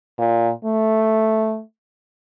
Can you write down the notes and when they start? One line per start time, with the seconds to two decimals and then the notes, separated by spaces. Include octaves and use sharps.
0.19 A#2
0.65 A3